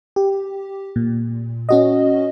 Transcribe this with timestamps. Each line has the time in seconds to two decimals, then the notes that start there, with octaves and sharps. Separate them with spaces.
0.16 G4
0.96 A#2
1.69 C#4 F#4 D#5